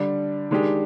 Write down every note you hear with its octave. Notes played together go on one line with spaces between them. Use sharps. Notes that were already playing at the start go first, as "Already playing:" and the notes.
Already playing: D3 G3 D4
D#3 G#3 D4 G4